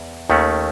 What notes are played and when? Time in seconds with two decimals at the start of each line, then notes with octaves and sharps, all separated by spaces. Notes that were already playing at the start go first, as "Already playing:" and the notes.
Already playing: E2
0.30 D#2 D#3 A3 C#4